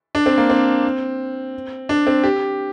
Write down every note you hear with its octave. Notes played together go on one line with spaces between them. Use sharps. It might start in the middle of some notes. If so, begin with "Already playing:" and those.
D4
C4
A#3
C4
D4
C4
G4